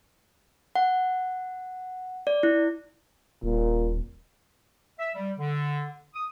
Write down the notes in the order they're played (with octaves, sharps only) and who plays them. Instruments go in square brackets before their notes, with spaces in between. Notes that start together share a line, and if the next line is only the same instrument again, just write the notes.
[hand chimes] F#5
D5
E4
[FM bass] D#1 [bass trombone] A#2
[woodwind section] E5
G3
D3
D#6